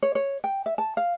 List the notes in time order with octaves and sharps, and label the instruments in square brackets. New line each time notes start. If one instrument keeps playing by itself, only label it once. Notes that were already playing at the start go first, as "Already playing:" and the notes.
[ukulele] C#5
C#5
G5
E5
A5
F5